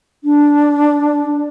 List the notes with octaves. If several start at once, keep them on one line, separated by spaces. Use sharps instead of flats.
D4